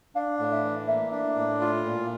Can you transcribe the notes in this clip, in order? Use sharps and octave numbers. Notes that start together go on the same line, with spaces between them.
D4 F5
A2
E5
E3
A#3 E5
D4
A2
F4
A#2